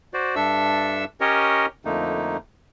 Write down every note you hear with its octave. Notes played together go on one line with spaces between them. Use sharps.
F#4 C5 D5
G2 D4 A4 E5 E6
C#4 G4 A#4 C#5 D#5
F2 D3 A3 A#3 D#4